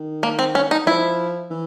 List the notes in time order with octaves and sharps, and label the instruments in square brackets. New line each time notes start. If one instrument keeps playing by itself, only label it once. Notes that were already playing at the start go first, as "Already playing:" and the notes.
Already playing: [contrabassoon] D#3
[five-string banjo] A#3
C4
C#4
D#4
[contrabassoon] F3 [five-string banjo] E4
[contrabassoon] E3